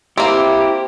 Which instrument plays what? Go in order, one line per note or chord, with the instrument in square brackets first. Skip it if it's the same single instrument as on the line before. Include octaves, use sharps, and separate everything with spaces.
[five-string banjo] A#3 C4 [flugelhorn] E4 [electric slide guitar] G4